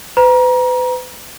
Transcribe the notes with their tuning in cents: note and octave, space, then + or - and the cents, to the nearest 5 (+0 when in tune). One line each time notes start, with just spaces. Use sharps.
B4 +35 A#5 +30